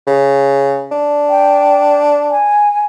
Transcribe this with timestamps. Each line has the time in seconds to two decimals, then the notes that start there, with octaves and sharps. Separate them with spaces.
0.07 C#3
0.91 D4
1.30 G5
2.31 G#5